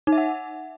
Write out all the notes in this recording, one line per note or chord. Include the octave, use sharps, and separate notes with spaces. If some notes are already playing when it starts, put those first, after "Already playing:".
D#4
E5
F#5